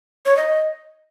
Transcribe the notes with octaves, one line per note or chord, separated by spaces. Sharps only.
C#5
D#5